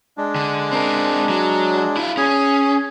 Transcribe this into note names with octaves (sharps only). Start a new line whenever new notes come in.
G#3 D4
D3
C4 A#4
F#3
E4 F4
C#4 G#4